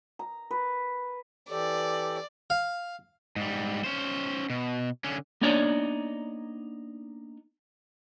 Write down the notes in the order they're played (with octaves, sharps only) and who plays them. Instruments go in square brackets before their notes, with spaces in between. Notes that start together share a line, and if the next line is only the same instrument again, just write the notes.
[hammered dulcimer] A#5
B4
[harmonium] E3 G4 A4 [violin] D5
[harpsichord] F5
[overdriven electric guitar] G#2 G3
C#4 C5
B2
D3 C#4
[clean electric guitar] A#3 B3 D4 D#4 C#5 D5